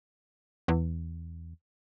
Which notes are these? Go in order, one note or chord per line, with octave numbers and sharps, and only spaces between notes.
E2